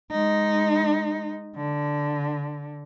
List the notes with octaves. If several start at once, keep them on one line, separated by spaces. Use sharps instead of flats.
G#3 D#4
D3